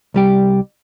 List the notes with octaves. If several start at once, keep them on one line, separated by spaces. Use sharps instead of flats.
C2 G3 G4